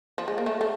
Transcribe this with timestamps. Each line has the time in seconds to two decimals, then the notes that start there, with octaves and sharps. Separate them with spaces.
0.18 F3
0.28 G#3
0.38 A#3
0.46 A3
0.61 A3